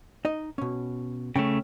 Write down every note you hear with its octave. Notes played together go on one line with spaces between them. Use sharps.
D#4 D#5
B2 C#4
C#3 A3 C#4 G5